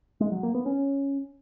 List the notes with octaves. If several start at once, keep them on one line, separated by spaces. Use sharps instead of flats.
G#3
F#3
A#3
B3
C#4